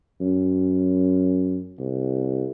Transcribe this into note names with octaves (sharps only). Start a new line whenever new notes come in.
F#2
C2